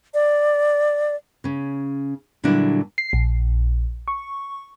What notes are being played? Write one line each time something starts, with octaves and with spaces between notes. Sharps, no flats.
D5
C#3 C#4
A#2 D3 F#3 G3 D4 E4
C7
A#1
C#6